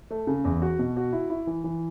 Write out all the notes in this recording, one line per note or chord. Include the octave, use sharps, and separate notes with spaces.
A3
C#3
E2
F#4
B2
F#4
E4
E4
E3
E3